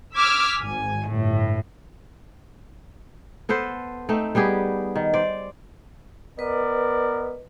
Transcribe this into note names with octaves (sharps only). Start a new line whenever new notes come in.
D6 E6 F6 G#6 B6
G#1 G#5
G1 A2
B3 A4 B4 C5
A3 C4 D#4
G3 B3 G4 G#4
D#3
C5 D5
B3 A#4 B4 D5 D#5